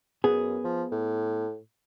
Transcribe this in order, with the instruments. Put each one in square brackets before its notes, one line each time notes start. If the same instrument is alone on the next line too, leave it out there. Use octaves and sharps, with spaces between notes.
[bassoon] F#2 [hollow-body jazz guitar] B3 G#4
[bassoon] F3
A2